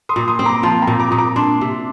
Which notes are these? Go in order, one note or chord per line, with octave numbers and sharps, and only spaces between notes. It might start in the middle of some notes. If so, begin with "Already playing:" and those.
C6 D#6
A#2
C6 D#6
C4
A#5 D6
F3 A5 C6
G5 A#5
A#2
A#5 D6
A#2 D#6
A#5 D6
D4 A5 C6
C3